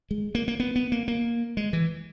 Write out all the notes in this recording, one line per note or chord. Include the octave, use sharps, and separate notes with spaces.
G#3
A#3
A#3
B3
B3
A#3
A#3
G#3
E3